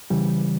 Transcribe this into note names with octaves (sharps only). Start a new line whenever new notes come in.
C#3 E3 G3